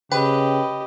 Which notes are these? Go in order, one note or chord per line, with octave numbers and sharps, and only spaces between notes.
C#3 G4 B4 D#5 G5